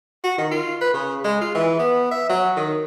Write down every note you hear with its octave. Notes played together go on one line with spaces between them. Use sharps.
F#4
D#3
F4
B4
C#3
G#3
F4
E3
B3
E5
F#3
D#3